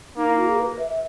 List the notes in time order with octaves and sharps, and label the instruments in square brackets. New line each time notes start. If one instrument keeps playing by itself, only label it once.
[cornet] A#3 [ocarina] D#4
[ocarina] E4
F#4
G#4
B4
E5
E5